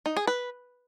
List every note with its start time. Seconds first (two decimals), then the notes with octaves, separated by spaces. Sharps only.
0.06 D#4
0.17 G#4
0.27 B4